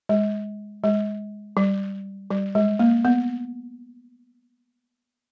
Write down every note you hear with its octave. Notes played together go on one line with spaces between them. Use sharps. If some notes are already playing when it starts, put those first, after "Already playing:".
G#3
G#3
G3
G3
G#3
A#3
B3